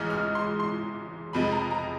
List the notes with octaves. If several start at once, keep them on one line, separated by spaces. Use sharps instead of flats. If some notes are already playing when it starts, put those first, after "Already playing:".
Already playing: A1 G#2 E3 G#3 F6
F6
C6
C6
F1 F2 C3 F3 G#3 B5
A#5
A#5